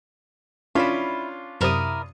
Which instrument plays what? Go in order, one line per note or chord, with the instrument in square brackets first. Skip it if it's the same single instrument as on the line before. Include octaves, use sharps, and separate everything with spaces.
[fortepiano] C#4 D4 F4 [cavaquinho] E4 B5
[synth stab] F#2 C3 D#6 [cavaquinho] E4 A#4 D5